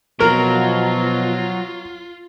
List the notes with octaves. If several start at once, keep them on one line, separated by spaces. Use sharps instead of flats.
B2 F3 F#3 F4 A#4